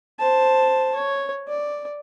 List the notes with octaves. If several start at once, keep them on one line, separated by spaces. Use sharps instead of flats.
C5 A5
C#5
D5